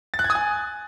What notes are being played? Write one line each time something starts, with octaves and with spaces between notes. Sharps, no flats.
A6
F#6
G#6
D#6
G#5